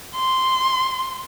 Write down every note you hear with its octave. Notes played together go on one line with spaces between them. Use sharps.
C6